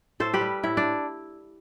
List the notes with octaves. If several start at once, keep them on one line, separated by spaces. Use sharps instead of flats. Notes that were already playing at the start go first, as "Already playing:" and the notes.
A2 A4 C5
G4 B4
G3
A2 E4
D4